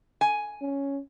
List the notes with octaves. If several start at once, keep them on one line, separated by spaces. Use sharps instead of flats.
G#5
C#4